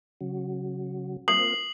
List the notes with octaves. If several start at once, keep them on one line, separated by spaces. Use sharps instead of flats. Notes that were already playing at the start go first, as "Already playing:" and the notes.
C#3 F#3
A#3 C4 F4 D#6 C7 F#7